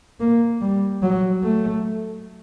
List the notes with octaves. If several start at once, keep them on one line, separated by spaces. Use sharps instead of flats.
A#3
G3
F#3
A3